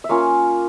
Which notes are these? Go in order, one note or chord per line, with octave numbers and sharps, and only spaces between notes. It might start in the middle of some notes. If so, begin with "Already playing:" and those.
E5
A#3 C#4 F4 C#5 F5